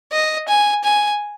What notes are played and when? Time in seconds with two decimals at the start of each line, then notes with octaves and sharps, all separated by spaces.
0.12 D#5
0.48 G#5
0.84 G#5